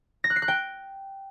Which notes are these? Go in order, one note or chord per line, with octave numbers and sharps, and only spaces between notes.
A#6
F#6
C7
F#6
G5